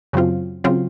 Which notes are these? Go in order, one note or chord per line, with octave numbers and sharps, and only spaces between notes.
F#2 C#3 F#3 C4 F4
C#3 F#3 C4 F4